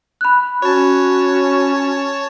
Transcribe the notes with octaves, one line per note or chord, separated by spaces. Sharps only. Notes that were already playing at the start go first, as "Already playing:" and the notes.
B5 F#6
C#4 F#4 C#5 A5